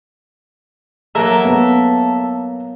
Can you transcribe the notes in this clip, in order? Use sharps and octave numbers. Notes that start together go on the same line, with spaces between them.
F#3 A#3 A4 A#4 E5
B3